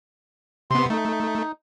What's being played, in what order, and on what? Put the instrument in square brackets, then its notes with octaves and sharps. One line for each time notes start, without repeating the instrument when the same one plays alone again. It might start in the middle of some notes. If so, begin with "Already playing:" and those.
[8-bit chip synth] C3 B3 [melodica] C6
[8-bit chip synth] A3 [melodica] D#4